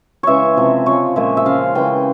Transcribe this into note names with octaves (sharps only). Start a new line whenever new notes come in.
C#3 E3 G#3 C#5 E5
C3 F3 G#3
C#3 F3 G#3 C#5
A#2 F3 G#3 E5
E5
C#3 F3 G#3 F5
C#3 E3 G#3 G5